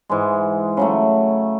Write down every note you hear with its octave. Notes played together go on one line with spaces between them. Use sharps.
G#2 E3 G#3
C#3 F#3 A3